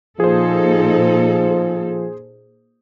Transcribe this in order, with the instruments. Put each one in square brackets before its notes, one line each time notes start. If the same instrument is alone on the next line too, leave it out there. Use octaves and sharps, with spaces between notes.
[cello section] A#2 D#4 A4 [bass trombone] F3 [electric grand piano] G#4 C5